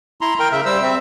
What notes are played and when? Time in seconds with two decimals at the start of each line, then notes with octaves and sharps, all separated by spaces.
0.21 E4 A#5 C6
0.40 A#4 G5
0.52 C#3 E5
0.66 G3 C5 E6
0.82 C4 E5